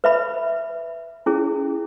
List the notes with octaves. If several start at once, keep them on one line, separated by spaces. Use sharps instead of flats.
B4 E5 B5
C#4 E4 G#4